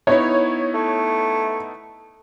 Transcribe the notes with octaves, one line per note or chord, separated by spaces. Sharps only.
B3 D#4 E4 C#5
A3